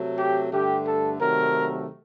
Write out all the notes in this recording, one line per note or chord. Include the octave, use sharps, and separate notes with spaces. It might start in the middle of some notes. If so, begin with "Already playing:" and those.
Already playing: C3 F#3 A3
G4
G2 D3 A3 G4
A4
C3 D#3 F#3 A3 A#4